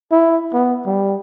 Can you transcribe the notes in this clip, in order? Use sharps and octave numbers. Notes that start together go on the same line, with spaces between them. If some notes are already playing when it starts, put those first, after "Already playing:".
E4
B3
G3